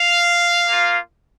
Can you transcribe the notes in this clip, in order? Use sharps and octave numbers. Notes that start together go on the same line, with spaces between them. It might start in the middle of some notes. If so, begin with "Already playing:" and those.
Already playing: F5
A#3 F4